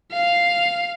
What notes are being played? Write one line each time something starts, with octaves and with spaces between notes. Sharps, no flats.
F5